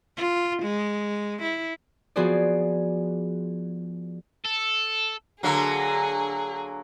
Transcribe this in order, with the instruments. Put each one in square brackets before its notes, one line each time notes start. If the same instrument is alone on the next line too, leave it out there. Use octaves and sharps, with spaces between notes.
[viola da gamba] F4
G#3
E4
[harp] F3 B3 F#4 G#4 C5 D5
[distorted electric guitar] A4
[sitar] D3 F#3 A#3 [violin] G#4